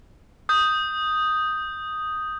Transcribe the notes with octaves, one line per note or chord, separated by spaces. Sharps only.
D#6 G6